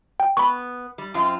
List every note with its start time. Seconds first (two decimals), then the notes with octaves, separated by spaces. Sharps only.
0.20 G5
0.37 B3 B5 C#6
0.98 G3
1.14 F#2 C4 F4